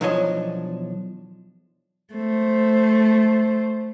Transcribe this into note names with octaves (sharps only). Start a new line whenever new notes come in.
B1 E2 F3 D4 C#5 D#5
A3 C5